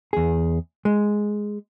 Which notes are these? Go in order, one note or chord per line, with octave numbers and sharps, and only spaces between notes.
E2 G#4
G#3